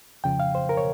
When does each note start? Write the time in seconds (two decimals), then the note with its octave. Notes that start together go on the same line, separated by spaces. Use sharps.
0.24 F2 C#3 F3 G5
0.40 F5
0.55 C5
0.69 A#4
0.77 C#5